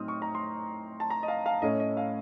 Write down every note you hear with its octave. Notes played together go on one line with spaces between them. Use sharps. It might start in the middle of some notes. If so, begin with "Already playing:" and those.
Already playing: A2 F#3 C4 D#4 D#6 F6
C#6
A#5
C6
A5
A#5
D#5
F5
F5
A2 A3 C#4 D#5
D#5
F5